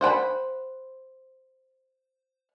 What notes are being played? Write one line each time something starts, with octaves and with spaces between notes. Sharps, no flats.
C5 F#5 G5 B5